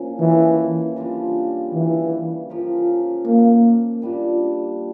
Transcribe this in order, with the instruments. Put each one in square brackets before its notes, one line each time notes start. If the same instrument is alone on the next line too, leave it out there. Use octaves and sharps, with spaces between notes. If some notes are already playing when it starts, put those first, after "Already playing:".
Already playing: [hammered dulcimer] A#2 F3 C#4
[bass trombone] E3
[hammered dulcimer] C#3 G3 D4 F4
[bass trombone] E3
[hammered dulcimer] F3 C#4 G4 A#4
[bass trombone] A#3
[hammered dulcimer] A#2 G3 D4